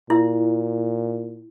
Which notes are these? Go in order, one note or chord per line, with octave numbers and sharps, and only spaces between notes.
A#2 E4